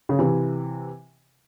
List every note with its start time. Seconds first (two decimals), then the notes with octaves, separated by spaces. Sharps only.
0.09 C#3
0.19 C3 E3